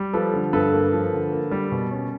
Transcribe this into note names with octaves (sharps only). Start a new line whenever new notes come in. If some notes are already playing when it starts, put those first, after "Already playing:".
Already playing: G3
F3 A4 B4
D3
G2 A4 B4
A#3
F3
D3
A#3
G3
B2
C#4